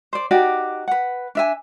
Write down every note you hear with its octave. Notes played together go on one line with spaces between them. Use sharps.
C5 D5
D#4 F#4 G4 D5
B4 F#5
D4 E5 G#5